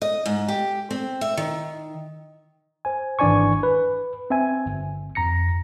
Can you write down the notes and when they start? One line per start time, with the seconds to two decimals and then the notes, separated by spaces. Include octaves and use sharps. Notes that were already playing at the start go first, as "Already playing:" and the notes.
0.02 D#5
0.26 G#2
0.48 G4
0.91 C4
1.21 E5
1.37 D#3
2.85 C5 G#5
3.19 G#1 E3 D4 D5 G#5 C#6
3.63 B4
4.30 C4 E5 G#5
4.66 G1
5.15 F2 A#5 A#6 C#7